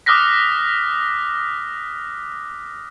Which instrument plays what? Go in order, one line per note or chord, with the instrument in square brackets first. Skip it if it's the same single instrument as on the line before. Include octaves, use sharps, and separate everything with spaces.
[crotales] D6 D#6 F6 F#6 A#6 B6